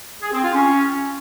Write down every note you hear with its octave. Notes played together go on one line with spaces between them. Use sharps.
G#4
C4
F4
C#4